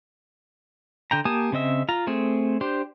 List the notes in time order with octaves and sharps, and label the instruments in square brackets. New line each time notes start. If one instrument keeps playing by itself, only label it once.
[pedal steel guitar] D3 G5 A#5
A#3 G4 G#5 A5 D#6
C#3 C4 D#5 E5
F4 A#5
A3 C4 G#4
D4 G4 C5